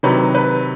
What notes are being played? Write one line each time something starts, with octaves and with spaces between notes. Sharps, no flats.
C3 D#3 F#3 B4
B4